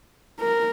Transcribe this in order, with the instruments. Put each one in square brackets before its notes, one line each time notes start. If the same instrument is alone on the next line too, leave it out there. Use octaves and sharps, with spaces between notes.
[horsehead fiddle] A#4